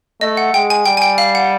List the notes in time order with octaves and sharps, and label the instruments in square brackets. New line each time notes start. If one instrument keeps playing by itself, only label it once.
[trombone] A3 [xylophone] D#5
[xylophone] F#5
[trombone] G#3 [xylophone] G5
[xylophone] G#5
[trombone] G3 [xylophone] G5
[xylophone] G#5
G5
F5
F#5